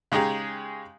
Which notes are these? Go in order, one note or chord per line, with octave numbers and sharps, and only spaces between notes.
C#3 G#3 D#4 G4 G#4